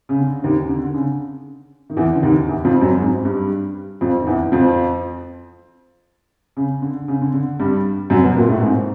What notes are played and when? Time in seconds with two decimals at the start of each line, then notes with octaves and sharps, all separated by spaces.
0.09 C#3
0.18 D3
0.43 D#2 D#3
0.69 D3
0.84 D3
0.94 C#3
1.90 D#3
1.97 E2 E3
2.15 D3
2.23 D#2 D#3
2.48 E2 E3
2.65 F2 F3
2.81 F#2 F#3
2.99 G#2 G#3
3.25 G2 G3
4.01 F2 F3
4.21 D#3
4.27 E2 E3
4.52 F2 F3
6.57 C#3
6.82 D3
7.08 C#3
7.21 D3
7.34 D3
7.60 G2 G3
8.10 F#2 F#3
8.23 B2 B3
8.36 A#2 A#3
8.49 A2 A3
8.61 G#2 G#3